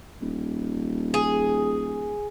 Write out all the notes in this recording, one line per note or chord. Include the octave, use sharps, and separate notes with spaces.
D#1
G#4